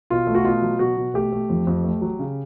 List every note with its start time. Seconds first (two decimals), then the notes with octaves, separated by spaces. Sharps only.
0.10 B2 F4
0.27 A3
0.35 F#4
0.44 B2 F4
0.62 F#3
0.79 B2 F#4
0.97 B2
1.14 A3 G4
1.32 A3
1.49 F2
1.67 F2
1.84 A3
2.02 F#3
2.19 C#3